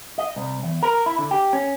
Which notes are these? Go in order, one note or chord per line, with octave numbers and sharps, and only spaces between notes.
D#5
C2
E2
A#4
E4
D3
G4
C#4